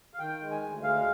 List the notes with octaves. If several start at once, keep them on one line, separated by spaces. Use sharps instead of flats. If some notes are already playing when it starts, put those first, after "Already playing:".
F5
D#3 G5
G#3
G#5
D2
G#3 F5